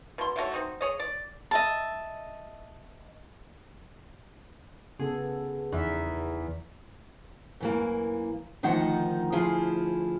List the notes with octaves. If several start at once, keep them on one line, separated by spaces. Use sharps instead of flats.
B2 C6
D3 A3 F#4 C#5
C4 D#4 F#4
G#4 C#5 D#5
D5
D#5 E5 A5
C#3 B3 G#4 A4
E2 D#4 E5
F#2 E3 A#3
D2 D#3 F3 D#4 F#5
D2 F3 E4 F4 G#4